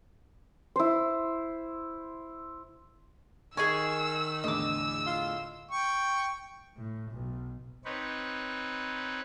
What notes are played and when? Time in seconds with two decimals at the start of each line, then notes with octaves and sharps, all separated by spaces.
0.76 E4 C5
3.57 D#3 G#4 D#5 G#5 C#6 E6
4.44 E2 A2 D3 D#5 D6 E6
5.06 F4
5.71 G5 C#6
6.76 A2
7.12 B1
7.85 C4 D#4 B4 C#5